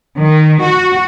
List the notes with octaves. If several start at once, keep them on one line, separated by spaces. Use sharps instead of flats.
D#3
F#4